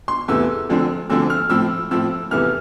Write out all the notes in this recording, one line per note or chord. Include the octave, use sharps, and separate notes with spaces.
C6
E2 C3 E3 A3 E6
D2 D3 F3 C4
D2 D3 F3 C4 E6
F6
A2 F3 C4 E6
A2 F3 C4 E6
E2 C3 E3 A3 F6